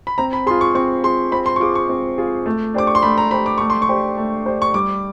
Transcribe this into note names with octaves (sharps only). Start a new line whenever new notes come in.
B5
C4 A#5
B5
F4 G#4 C6
C#6
C4 C#6
F4 G#4 C6
C4 B5
C6
C#6
F4 G#4 D6
C#6
C4
F4 G#4
A3
D4 G4 C5 D6
C#6
C6
A3 B5
A#5
D4 G4 C5 B5
D6
A3 C#6
C6
C#6
D4 G4 C5
A3
D4 G4 C5
C#6
G3 D6